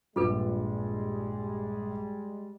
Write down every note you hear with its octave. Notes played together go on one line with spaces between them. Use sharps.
A#1 G2 G3 G#3 F4 A4 B4